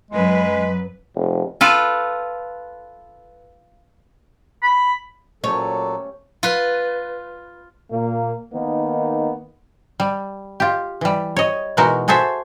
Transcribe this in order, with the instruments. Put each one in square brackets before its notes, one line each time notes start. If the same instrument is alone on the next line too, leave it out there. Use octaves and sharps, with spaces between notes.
[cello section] F#2 B4 [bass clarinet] G#3
[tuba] F1
[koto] F4 A4 B4
[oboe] B5
[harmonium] A#2 F#3 A4 [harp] A3 C#4 G4 [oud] C#5
[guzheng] F4 B4
[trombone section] A#2 A#3
D#3 A#3 B3 D#4
[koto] G3
F4 G4
E3 G3
C#5 D#5
B2 E3 G#3 D#4 F#4 A#4
F#4 G#4 A4 C5 E5